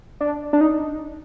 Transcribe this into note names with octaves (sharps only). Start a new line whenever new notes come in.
D4
D4
D#4